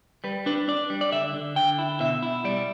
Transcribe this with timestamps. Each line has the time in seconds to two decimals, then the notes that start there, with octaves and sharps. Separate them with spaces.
0.24 G3 B4
0.46 D4 B4
0.68 D4 D5
0.90 G3
1.01 D5
1.12 D3 E5
1.34 D3
1.56 D3 G5
1.78 E4
2.00 B2 E5
2.23 E4
2.44 G3 D5